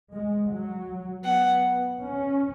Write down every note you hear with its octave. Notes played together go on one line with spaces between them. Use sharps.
G#3
F#3
B3 F#5
C#4